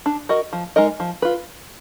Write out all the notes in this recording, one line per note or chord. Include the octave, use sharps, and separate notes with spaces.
D4
F#4 A#4 D#5
F3
G#3 D#4 A#4 D#5
F3
F4 B4